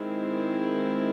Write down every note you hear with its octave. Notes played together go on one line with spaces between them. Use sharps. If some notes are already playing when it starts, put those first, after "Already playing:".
Already playing: D#3 G#3 C4 E4